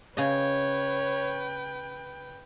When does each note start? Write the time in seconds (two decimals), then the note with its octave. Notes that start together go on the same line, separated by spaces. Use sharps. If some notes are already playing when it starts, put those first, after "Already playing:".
0.17 C#3 B4 C#5 D#5 G5